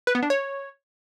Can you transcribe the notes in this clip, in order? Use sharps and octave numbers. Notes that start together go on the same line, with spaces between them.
B4
B3
D4
C#5